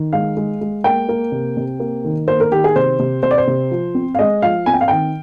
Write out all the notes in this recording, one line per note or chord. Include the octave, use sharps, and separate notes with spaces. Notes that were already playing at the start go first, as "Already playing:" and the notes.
Already playing: D#3
G#3 F5
G#3
G#3
A#3 G5
A#3
C3
C3
A#3
D#3
A#3 C5
A#4
D#3 G4
G#4
C3 C5
C3
C3 C5
D5
C5
C3
F3
C4
F5
G#3 D#5
F3 F5
C4 G#5
G5
F5
D#3 G5